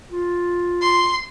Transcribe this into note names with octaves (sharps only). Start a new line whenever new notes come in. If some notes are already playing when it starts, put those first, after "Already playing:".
F4
C6